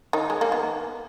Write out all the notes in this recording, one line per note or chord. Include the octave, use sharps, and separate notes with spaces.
D#3 D#4
G#3
A#3
B3